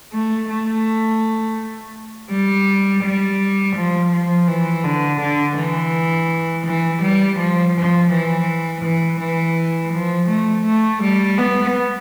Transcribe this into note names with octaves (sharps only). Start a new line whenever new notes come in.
A3
A3
G3
G3
F3
F3
E3
D3
D3
E3
E3
G3
F3
F3
E3
E3
E3
F3
A3
A3
G3
B3